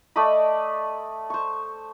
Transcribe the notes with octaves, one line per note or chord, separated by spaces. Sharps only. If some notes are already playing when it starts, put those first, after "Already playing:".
A3 D5 D#5 B5
C5 C#6